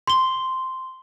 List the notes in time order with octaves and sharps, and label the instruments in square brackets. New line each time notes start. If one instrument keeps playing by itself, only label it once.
[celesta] C6 G7